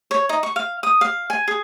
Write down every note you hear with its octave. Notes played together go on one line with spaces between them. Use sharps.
C#5
D#4
C#6
F5
D#6
F5
G#5
G#4